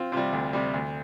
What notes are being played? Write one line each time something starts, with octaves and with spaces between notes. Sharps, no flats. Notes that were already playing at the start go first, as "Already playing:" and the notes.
Already playing: C4 F4
C3 G3 C4 F4
D2
C3 G3
D2